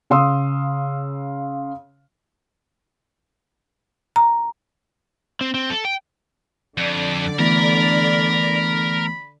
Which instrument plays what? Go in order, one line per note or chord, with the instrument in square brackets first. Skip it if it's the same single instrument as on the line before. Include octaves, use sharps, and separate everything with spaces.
[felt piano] C#3 F5 C6 D#6 E6
[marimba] A#5
[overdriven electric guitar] C4
C4
A4
G5
[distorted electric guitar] F2 [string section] D3 D5
[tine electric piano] E3 A3 B3 [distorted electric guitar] A#4 [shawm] B5